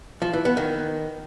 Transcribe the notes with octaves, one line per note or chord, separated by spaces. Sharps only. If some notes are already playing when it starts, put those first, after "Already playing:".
F3
E3
B3
D#3